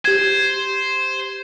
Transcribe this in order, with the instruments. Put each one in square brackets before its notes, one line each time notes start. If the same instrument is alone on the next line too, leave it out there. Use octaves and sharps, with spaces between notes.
[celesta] G4 G#6 [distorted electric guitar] C5